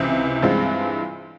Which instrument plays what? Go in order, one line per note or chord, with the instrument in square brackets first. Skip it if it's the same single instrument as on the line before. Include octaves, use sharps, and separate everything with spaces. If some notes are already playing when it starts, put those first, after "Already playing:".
Already playing: [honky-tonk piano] C#2 C3 E3
G2 E3 G#3 C4 F4